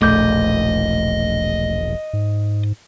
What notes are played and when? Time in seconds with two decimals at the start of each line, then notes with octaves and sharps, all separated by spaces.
0.02 E1 A#1 A3 D#5 D6 G6
2.13 G#2